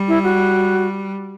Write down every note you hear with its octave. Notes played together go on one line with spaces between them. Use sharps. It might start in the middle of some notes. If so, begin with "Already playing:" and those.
Already playing: G3
E4
F#4